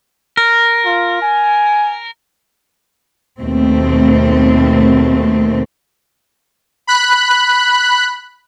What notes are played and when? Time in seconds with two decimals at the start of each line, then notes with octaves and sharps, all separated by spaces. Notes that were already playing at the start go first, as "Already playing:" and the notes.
0.37 A#4
0.85 F4
1.22 G#5
3.40 D#2 B2 A3 C4
6.87 B5 F#6